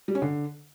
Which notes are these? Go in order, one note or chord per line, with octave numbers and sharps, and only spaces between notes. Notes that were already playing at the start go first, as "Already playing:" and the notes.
G3
C#4
D3